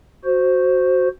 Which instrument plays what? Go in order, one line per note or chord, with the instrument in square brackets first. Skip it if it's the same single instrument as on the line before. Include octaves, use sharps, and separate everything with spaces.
[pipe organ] F#4 C5